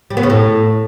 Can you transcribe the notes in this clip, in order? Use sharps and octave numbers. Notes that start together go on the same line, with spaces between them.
G3
B3
C#3
A2